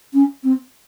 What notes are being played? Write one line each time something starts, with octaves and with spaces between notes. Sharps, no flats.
C#4
C4